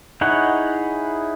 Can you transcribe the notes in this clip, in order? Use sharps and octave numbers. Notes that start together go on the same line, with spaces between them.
D#4 E4 G#4 C#5 F#5